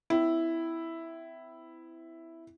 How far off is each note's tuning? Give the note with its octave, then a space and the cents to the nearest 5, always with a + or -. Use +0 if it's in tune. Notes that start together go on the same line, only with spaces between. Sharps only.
C4 -40 E4 +0